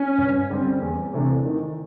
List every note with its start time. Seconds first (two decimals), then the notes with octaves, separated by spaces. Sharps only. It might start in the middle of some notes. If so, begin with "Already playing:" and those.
Already playing: C#4
0.18 G2
0.50 D3 G3 C4
0.82 E2
1.14 C3 E3 A3 D4
1.45 D#3